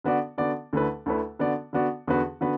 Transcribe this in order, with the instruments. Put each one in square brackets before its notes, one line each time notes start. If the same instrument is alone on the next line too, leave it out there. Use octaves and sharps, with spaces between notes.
[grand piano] D3 B3 F#4 D5
D3 B3 F#4 D5
D2 D3 A3 E4 B4
D2 D3 A3 E4 B4
D3 B3 F#4 D5
D3 B3 F#4 D5
E2 D3 B3 F#4 B4
D3 B3 F#4 B4